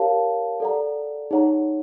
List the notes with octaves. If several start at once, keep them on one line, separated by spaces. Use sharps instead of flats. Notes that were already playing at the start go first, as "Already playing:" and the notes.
Already playing: G4 A#4 C#5 F5 A5
A4 D5 F#5 A#5
D#4 G#4 C#5 F#5 A#5